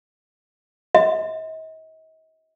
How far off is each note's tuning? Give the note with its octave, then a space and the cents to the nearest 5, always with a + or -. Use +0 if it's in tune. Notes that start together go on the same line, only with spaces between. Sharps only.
D#5 +40